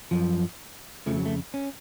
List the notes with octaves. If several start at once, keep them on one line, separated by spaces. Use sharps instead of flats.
F#2 F3
F2 C#3 F3 A3
F#3
A3
C#4